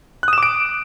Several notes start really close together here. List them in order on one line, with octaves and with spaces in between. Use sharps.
F#6 D#6 E7 D6 D7